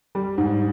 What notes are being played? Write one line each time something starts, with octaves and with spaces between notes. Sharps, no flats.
G3
G#2